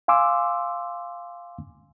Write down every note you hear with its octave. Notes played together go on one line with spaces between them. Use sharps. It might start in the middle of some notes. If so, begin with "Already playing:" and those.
F5 G#5 C6 D6 E6